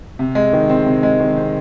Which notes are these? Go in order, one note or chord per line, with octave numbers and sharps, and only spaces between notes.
C3
G#3
D#3
C4
C3
G#3
D#3
C4